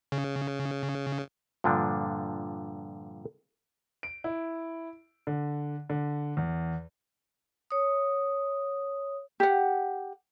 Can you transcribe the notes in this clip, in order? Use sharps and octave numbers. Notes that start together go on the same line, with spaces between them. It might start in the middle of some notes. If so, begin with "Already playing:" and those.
C#3
G2 A#2 D3 F3 D4
D7
E4
D3
D3
E2
C#5 D#6
G4 F#5